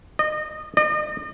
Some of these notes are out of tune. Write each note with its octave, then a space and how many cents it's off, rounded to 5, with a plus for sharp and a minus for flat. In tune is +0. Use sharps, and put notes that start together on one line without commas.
D#5 -25
D#5 -40